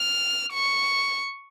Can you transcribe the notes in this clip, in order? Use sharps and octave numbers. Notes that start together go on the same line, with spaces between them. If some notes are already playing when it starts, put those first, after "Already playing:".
Already playing: F6
C#6